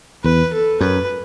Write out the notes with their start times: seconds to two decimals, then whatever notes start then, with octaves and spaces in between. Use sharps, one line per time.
0.24 E2 B4
0.53 A4
0.81 F#2 B4